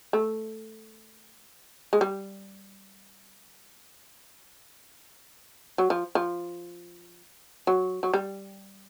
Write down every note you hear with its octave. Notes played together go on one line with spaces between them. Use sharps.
A3
G#3
G3
F#3
F3
F3
F#3
F#3
G3